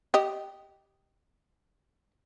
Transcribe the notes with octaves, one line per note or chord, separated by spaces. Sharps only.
G4 D#5